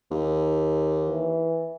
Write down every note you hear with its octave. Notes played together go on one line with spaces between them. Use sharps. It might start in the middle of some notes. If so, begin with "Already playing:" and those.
D#2
E3